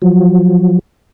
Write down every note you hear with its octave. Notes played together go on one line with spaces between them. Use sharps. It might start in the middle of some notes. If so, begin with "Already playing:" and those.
F3 F#3